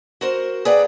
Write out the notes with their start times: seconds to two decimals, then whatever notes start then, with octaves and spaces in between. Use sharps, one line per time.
0.21 F#4 A#4 C5
0.65 G#4 B4 D5 F#5 G5 A#5